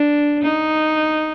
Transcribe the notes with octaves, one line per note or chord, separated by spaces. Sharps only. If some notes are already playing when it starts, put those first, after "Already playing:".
Already playing: D4
D#4